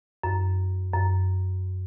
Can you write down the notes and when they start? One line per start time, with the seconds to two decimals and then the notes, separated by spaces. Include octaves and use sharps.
0.24 F#2
0.94 F#2